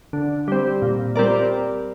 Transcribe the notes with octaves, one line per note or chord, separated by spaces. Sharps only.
D3
G3 C4
A#2
G3 C4 A#4 D5